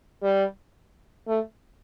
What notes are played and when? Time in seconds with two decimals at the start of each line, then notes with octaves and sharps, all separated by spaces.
0.23 G3
1.28 A3